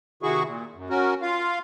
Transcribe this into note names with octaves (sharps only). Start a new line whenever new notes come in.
C3 D#3 E4 F#4 G#4 C#6
A#2
F#2
C#4 F#4 A#4
F4 F5